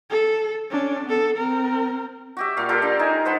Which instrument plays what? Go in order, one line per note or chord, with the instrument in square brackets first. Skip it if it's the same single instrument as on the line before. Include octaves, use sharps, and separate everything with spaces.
[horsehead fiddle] A4
C#4 D4
B3 A4
C4 A#4
[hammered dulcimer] F#4 G4 E5
A#2 F5
F4 G4 A4 A#4
D4 F5
D#4 G#5 A#5
B4 C5 F#5 A5